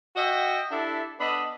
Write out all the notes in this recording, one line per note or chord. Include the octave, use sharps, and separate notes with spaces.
F#4 D#5 E5 G5
D4 E4 G4 A4 E5
B3 D4 A4 D#5 A5 B5